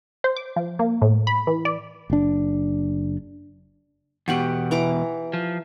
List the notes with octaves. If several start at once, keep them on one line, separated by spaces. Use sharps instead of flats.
C5
D6
F3
A#3
A2
B5
E3
D5
F#1 D4
E2 B2 F#4 G4 F#5
E3 A#5 D6
F3